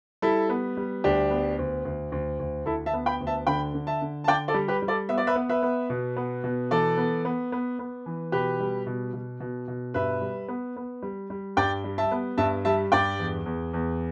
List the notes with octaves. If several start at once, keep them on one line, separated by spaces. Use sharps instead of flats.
G3 E4 A4
B3
G3
D2 D4 G4
B3
D2
D2
D2
D2
D2 E4 A4
E5 A5
B3
G5 B5
D2
E5 A5
D3 G5 B5
D3
E5 A5
D3
A5
D3 D5 G5
A4 D5
G3
G4 B4
G3
A4 D5
B3 E5
D5
B4 E5
B3
B4 E5
B3
B2
B3
B2
E3 A4 D5
B3
B3
B3
B3
E3
B2 G4 B4
G3
B2
B2
B2
B2
G2 B4 E5
G3
B3
B3
G3
G3
G2 D5 G5
G3
E5 A5
B3
G2 E5 A5
G3 E5 A5
G2 D5 G5
E2
E2
E2